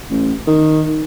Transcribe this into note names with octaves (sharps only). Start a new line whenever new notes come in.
A1
D#3